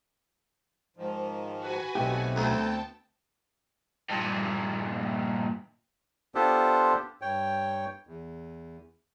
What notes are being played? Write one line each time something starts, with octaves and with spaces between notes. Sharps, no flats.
G#2 D#3 F3
F#4 B4 G#5
B1 A3 B3 C4 G4
D2 G5 A5
G2 A#2
B3 D4 F4 G4 A4 C5
G2 C#5 G5
E2